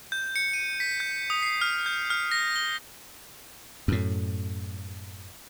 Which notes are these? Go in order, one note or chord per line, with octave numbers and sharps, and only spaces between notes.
G6
C#7
D#7
B6
G6
D#6
C7
F6
G6
F6
A#6
G7
F#2 A2